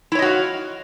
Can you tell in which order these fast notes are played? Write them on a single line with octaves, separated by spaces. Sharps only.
E4 C#5 D#5 F#4 F5